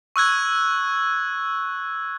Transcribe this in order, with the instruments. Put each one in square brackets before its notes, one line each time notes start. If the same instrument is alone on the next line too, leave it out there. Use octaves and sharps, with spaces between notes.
[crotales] C#6 E6 F#6 G#6